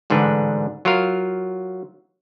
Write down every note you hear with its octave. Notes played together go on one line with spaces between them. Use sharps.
A1 G#2 D3 D4 B4
F#3 F4 A#4 F5